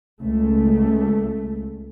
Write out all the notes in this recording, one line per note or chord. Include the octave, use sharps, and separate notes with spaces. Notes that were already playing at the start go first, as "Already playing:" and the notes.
C#2 A3